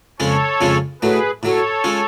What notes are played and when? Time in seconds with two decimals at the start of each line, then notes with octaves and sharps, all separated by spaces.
0.20 F2 C#3 G#3 C#4 F4 A4 C#5
0.61 F2 C#3 G#3 C#4 F4
1.02 A2 F#3 A3 G#4 B4
1.43 A2 F#3 A3 A4 C#5
1.84 G#3 C#4 F4